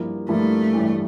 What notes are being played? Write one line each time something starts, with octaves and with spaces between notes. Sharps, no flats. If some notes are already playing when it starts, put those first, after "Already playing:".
Already playing: G2 F3 A#3 E4
G2 F3 A3 A#3 E4
A1 G2 E3